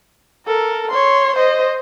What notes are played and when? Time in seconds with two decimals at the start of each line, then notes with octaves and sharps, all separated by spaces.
0.46 A4 A#4
0.91 C#5 C6
1.36 C5 D#5